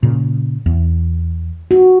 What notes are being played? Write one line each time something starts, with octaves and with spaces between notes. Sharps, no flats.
A#2 C#3
E2
F#4